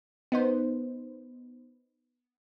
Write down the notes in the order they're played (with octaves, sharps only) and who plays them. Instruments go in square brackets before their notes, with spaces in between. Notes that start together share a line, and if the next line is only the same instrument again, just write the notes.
[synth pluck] B3 D#4 C5